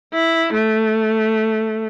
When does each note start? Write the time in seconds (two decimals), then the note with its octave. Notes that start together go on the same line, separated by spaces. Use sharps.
0.13 E4
0.53 A3